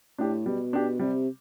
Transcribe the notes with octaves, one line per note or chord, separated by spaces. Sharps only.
A2 D4 G4
B2 G3
D4 G4
C3 G3